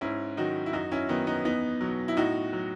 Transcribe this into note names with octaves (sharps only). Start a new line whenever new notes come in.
G#2 C#4 E4
D#3 F#3 D#4 F#4
E4
F#2 D#4 F#4
C#4 E4
D#3 F#3 B3 D#4
B3 D#4
E2 B3 D#4
B2 F#3
E4
A2 D#4 F#4
F#3